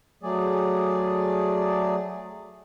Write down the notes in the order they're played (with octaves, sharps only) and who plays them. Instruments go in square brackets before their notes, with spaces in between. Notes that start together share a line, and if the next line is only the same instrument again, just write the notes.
[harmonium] F#3 A3 G#4 D5